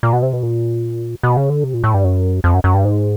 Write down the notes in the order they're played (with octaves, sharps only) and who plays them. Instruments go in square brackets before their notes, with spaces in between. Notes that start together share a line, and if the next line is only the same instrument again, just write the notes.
[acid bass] A#2
B2
C3
B2
A#2
B2
C#3
D3
C3
A#2
A2
G2
F#2
F2
F#2
F#2
G2
G#2